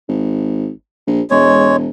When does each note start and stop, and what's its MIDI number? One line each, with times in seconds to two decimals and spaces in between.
0.08 0.70 32
1.07 1.21 34
1.31 1.89 28
1.31 1.76 56
1.31 1.76 73